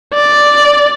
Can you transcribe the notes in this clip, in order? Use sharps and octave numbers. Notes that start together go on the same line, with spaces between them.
D5